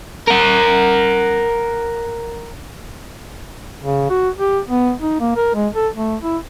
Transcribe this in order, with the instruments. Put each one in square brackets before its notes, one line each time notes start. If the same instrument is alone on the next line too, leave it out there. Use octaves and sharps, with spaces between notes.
[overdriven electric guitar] A#4 F#5
[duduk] C#3
F#4
G4
B3
D#4
A#3
A#4
G#3
A4
A3
E4